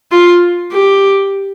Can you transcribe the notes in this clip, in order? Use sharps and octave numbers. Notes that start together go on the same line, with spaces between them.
F4
G4